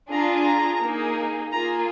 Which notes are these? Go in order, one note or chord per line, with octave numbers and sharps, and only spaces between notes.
D4 F4 G#4 A#5
A#5
A#3 D#4 G#4
A#3 F4 G#4 A#5